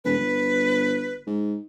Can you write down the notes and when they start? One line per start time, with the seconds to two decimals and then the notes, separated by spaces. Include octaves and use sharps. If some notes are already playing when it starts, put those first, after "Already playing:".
0.04 E1 B4
0.19 G1
1.27 G#2